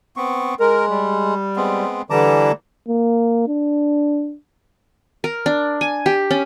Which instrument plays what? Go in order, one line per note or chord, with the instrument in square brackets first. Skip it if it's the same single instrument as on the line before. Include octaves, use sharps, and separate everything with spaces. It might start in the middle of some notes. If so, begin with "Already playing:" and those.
[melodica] B3 C4 C#6
[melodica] G#3 [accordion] A#4
[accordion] G3
[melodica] G#3 B3 C4
[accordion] D3 E3 G3 [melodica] A5 A#5 D6
[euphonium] A#3
D4
[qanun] A#4
D4
G#5
G4
C#4